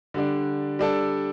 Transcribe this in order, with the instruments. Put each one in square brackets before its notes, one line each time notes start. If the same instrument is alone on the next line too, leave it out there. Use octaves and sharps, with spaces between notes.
[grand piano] D3 G3 D4
G3 D4 A4